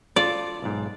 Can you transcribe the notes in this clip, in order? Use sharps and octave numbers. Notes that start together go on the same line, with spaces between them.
F4 A4 D5
B1 G#2